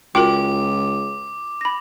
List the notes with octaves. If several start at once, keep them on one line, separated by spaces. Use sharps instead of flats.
C#2 F4 F#4 A#4 G5 D6
B5 A#6